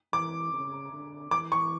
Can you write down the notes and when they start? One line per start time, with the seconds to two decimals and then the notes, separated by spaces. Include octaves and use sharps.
0.13 E3 D6
0.53 C#3
0.92 D3
1.31 E3 D6
1.52 C#6